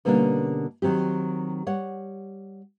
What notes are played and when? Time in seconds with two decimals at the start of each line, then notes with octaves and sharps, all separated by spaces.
0.05 B2 D3 G3 A#3 C#4 D4
0.82 D#3 F#3 C4 G4
1.66 G3 C#5 F#5